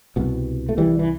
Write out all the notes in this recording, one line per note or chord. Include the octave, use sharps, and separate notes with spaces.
C2 B2
A3
E3 G3
E3